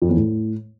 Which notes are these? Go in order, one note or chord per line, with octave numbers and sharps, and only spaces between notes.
F2
E2
A2